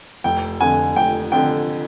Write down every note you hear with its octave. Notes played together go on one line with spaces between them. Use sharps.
F1 G5
F2 D3 G#5
F1 G5
F2 D3 G5